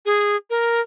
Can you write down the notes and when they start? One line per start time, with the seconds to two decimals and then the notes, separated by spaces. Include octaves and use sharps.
0.06 G#4
0.50 A#4